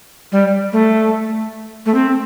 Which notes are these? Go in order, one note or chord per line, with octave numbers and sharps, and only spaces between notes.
G3
A3
A3
C4